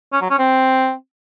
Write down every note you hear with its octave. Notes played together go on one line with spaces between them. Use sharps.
C#4
F#3
C#4
C4